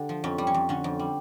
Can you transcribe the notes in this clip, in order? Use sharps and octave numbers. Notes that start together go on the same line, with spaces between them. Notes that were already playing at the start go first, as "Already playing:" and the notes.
Already playing: D3 G4
F3
F2 C#4
G3
C#4
F2
D3 C#4
F2
G3